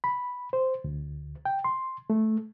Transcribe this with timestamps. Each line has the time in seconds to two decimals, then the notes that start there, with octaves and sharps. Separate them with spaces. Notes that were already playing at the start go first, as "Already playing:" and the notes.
0.04 B5
0.53 C5
0.84 D2
1.45 G5
1.64 C6
2.10 A3